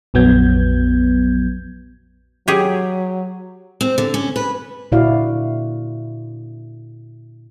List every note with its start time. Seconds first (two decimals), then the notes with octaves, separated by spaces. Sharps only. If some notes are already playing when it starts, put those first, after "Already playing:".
0.14 A#1 F2 F#3 B3 G6 G#6
2.48 F#3 G4 G#4
3.81 C4
3.98 D3
4.14 C#4
4.36 B4
4.92 A#2 D3 E4 F#4 D5 F5